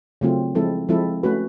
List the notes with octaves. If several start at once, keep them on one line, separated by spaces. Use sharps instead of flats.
C#3 F#3 A3 C4 F4
F3 G#3 C4 E4 A4
F3 G#3 C4 E4 A4
A3 C#4 F#4 B4